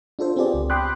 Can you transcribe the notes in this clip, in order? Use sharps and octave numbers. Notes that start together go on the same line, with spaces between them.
D4 F4 A4 C5
B3 C4 F4 G4 G#4 D5
C#2
G5 B5 C6 D6 D#6 F#6